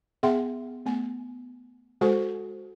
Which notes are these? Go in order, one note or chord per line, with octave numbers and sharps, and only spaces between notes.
B3 G#4 E5 F#5 G5 C6
A3 B3 G#5
G#3 F#4 A4 C5 G#5 C#6